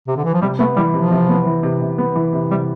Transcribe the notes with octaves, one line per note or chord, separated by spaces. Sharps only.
C3
D3
E3
F3
C3 G3
A3 B3
E3 G3
C3 F3
C3
B3
E3
C3
C3
B3
E3
C3
C3 G3